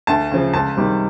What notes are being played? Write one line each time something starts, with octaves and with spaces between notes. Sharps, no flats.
D2 A5
C#3 F3
C#2 A5
C3 D#3 G3